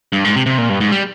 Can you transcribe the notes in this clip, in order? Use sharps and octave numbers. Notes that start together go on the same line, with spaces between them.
G2
G#2
C3
C3
A#2
G2
G#2
G3